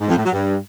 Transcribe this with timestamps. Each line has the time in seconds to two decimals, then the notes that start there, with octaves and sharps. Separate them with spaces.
0.01 G#2
0.08 F2
0.16 A2
0.24 F#3
0.32 G2